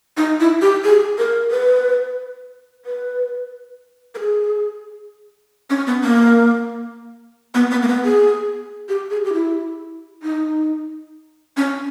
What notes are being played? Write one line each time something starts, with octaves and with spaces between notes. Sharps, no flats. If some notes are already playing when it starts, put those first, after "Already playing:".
D#4
E4
G4
G#4
A#4
B4
B4
A#4
G#4
C#4
B3
A#3
B3
B3
A#3
B3
G#4
G4
G#4
G4
E4
D#4
C#4